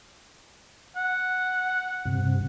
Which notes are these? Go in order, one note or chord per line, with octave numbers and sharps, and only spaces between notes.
F#5
G2 C3